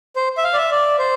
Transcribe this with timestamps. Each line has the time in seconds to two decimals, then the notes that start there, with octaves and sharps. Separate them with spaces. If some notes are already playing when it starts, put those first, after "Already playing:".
0.16 C5
0.37 E5
0.44 F5
0.53 D5
0.57 E5
0.71 D5
0.99 C5